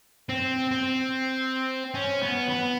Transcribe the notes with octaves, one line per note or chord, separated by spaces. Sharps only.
C4
C4
C#4
B3
B3